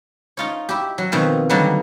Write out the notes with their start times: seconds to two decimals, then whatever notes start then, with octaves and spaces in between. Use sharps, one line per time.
0.37 D#4 F4 C#5
0.69 E4 G4
0.98 F#3
1.12 B2 D#3 F3 C4
1.50 D3 D#3 F#3 G3 A#3 B3